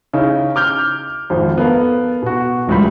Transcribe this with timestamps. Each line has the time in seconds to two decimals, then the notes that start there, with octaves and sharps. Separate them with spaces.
0.13 C#3 D#4 E4
0.56 D6 F6 G6
1.30 G#1 F2
1.57 B3 A4 A#4 F5
2.22 B2 F#4
2.68 E1 C#2 F#3 G3 B5